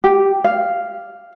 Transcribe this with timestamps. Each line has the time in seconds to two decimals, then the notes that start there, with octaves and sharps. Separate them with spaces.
0.04 G4
0.44 F5